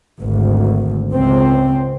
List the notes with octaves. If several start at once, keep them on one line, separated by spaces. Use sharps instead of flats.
G#1 D2
C#2 C4